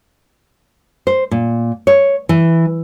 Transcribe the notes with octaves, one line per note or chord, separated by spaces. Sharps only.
C5
A#2
C#5
E3